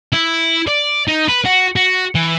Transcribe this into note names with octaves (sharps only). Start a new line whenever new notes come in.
E4
D5
D#4
B4
F#4
F#4
E3